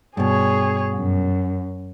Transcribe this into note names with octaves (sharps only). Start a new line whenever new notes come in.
G2 B2 G#4 C#5
F#2